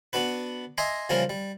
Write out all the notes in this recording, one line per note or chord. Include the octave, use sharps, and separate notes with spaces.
B3 D4 F#4 B4
D#5 E5 G#5 A#5 C6
C#3 E3 F3 G3 A#3 A#4
G3